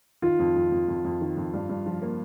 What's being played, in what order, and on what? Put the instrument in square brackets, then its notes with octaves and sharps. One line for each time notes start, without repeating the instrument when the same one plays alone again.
[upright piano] D#3 [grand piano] F4
[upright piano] F2
F2
F2
F2
F2
D#3
F2
G2
G2
F3
A#3